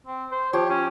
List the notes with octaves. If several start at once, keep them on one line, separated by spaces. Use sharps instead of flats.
C4
C5
F3 G4 C#5
C#4